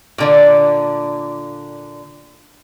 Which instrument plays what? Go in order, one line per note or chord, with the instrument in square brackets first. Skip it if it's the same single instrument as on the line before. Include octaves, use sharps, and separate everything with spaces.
[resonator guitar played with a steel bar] A#2 D3 D5